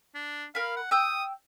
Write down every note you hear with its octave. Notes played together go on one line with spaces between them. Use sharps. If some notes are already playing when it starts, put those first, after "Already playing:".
D4
A#4 F5 B5
F#5
G5 D#6 E6 G6